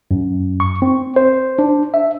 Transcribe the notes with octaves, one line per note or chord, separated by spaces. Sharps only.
F#2
C#6
C4
C5
D4
E5